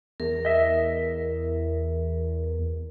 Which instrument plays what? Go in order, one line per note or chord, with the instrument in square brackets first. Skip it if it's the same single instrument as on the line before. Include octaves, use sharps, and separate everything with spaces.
[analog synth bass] E2 [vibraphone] A#4
[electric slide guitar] D#5 E5